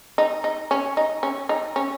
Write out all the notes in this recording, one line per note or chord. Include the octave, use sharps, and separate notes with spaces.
D#4
D#4
C#4
D#4
C#4
D#4
C#4